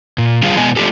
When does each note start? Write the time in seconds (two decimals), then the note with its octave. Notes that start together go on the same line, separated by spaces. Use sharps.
0.18 A#2
0.43 D3 G3 F4 G#4 F5
0.57 B2 G#3 B3 D#5 G#5
0.76 A3 D4 F4 G4 A4